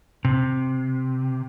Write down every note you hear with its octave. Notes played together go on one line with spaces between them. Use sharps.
C3